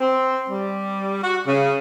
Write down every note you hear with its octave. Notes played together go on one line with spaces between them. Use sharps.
C4
G3
F#4
C#3